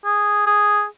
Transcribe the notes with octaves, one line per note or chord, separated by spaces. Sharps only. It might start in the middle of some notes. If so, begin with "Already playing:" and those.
G#4
G#4